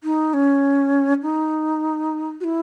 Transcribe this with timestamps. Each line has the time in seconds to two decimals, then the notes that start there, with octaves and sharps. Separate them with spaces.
0.04 D#4
0.34 C#4
1.22 D#4
2.40 F#4
2.44 E4